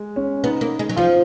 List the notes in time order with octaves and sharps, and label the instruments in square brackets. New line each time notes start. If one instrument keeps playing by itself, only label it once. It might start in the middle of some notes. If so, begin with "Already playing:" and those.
Already playing: [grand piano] G#3
C#4
[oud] B3 [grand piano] D#4
[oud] A#3
G#3
F#3
[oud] F3 [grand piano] F4